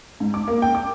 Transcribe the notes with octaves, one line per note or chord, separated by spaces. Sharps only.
G#2
D6
A#3
G5
D6